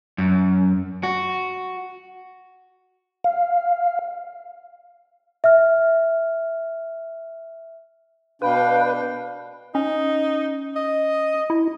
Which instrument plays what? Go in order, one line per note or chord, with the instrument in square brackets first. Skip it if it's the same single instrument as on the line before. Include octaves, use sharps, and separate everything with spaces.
[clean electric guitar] F#2
F#4
[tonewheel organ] F5
[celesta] E5 F6
[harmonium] B2 D4 G5 [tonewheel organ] B4 [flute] F5
[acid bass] C#4 [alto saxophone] D#4
[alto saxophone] D#5
[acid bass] E4